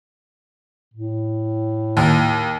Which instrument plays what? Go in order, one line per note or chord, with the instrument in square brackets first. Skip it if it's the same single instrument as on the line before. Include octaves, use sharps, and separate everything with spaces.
[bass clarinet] A2
[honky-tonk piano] D#2